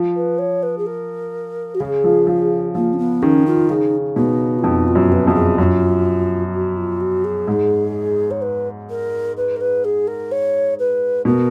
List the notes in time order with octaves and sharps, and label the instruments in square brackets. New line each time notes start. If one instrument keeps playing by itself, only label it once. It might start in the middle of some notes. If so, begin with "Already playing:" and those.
Already playing: [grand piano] F3
[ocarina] B4
C#5
B4
G#4
A#4
F#4
[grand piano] C#3 [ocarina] G#4
[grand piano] F3
F3
[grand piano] F3 [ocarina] A#3
[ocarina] C#4
B3
[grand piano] D#3 [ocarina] C#4
[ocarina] F4
[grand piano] C#3 [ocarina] D#4
[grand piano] B2 [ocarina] D#4
[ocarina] F4
[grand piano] F2 [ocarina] D#4
[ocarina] F4
[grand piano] F#2
[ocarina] B4
[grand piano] F2 [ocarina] F#4
[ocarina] G#4
[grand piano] F#2 [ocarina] F4
[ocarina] F#4
F4
F#4
G#4
[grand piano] G#2
[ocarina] C#5
B4
A#4
B4
A#4
B4
G#4
A#4
C#5
B4
[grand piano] B2 [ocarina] A#4